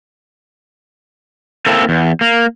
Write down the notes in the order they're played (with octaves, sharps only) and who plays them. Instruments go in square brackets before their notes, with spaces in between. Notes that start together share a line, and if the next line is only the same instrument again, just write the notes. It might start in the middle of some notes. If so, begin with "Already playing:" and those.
[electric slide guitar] A#3 C4 E4 A4
E2
A#3